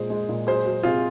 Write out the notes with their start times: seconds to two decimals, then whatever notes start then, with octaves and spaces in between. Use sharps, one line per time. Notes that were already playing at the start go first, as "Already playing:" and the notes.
Already playing: A#2 G#3 G#4 C5
0.10 G#3
0.29 A#2
0.47 F#3 G#4 C5
0.65 F#3
0.83 C3 F4 G#4